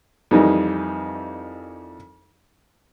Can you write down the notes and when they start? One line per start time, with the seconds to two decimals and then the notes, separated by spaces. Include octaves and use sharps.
0.31 F2 D#3 E3 G3 D#4